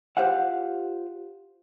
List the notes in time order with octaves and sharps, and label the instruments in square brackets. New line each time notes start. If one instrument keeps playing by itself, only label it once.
[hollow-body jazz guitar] F4 G4 C5 F5 F#5